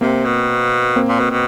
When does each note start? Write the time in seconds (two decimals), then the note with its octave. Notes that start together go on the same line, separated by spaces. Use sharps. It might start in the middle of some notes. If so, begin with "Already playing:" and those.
0.01 C3 A#3 C4
0.25 B2
0.96 A#3 C4
1.08 A#2
1.19 B2
1.31 B2